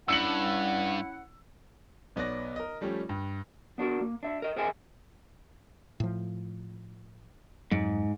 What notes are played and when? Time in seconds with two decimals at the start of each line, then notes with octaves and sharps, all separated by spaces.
0.08 G2 C#4 E4 F#5 E6 C#7 F#7
2.16 B1 B3 C#5 D5 A#6
2.56 A#4 D#5
2.81 F3 G3 A3 C#4 G4
3.09 G2
3.78 B3 D4 F#4 A#4
4.01 A#3
4.23 D4 E5
4.42 A#4 D#5
4.56 G#4 A#4 C5 D#5 E5 G#5
6.00 A2 F3
7.71 F2 G#2 F#3 G#3